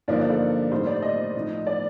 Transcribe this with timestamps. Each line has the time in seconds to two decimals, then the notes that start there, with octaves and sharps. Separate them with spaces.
0.08 G2 D3 F3 A#3 D#4 D5
0.19 D5
0.29 A4
0.71 A2 G3 C4 D#4 C5
0.87 D5
1.02 D#5
1.35 A2 F3 C4 D#4
1.67 D5